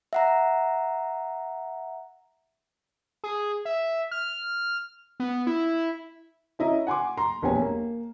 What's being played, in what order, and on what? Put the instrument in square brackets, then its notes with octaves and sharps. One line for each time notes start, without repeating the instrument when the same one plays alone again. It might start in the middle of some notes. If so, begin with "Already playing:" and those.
[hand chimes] E5 F#5 A#5
[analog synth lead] G#4
E5
F6
B3
E4
[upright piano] C#4 E4 D#5 A#5
F#5 G#5 C6 D6
A#5 C6
E1 A#1 B3 G4 C#5 G#5
A#3